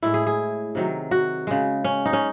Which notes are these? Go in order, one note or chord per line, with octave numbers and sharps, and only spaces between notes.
A2 G#3 E4
G#4
G#4
C3 D#3 F#3
F#4
C#3 G#3
C#4
D#4
C#4